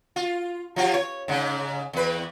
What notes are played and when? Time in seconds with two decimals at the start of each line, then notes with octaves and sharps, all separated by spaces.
0.16 F4
0.76 F3 F4 G4
0.94 C#5
1.28 G#2 C#3
1.93 E2 B4